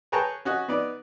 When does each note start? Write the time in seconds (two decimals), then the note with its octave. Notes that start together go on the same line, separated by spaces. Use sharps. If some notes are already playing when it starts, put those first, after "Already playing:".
0.12 G#4 B4 C#5 G5 A5 A#5
0.45 C#4 F#4 D#5
0.68 B3 D#4 D5